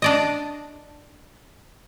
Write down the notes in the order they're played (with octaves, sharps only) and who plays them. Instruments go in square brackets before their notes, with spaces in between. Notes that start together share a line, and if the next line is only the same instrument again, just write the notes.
[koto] D4 D5 D#5